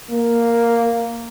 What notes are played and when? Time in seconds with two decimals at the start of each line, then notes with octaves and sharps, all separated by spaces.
0.10 A#3